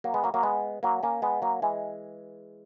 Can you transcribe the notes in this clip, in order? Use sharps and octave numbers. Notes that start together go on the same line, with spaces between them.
F#3 A#3
G#3 B3
F#3 A#3
F#3 A#3
G#3 B3
F#3 A#3
A#3 C#4
G#3 B3
F#3 A#3
E3 G#3